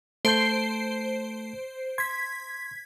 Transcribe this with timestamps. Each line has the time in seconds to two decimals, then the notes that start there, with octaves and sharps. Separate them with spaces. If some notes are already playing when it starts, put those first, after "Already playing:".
0.25 A3 C5 A5 G6 C7 D7
1.98 C6 G#6 B6